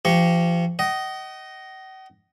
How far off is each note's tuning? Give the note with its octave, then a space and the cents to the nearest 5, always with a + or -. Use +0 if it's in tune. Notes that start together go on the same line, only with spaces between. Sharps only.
F3 -35 G4 -5 C#6 +0
D#5 +0 F#5 +45